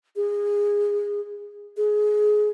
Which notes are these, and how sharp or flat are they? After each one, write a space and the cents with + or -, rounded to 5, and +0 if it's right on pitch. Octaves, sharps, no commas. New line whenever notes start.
G#4 -20
G#4 +20